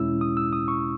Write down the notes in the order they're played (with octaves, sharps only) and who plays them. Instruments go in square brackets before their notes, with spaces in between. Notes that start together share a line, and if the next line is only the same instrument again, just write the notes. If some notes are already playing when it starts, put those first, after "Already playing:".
Already playing: [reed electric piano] E2 B2 G#3 C#4 E4 E6
D#6
E6
D#6
C#6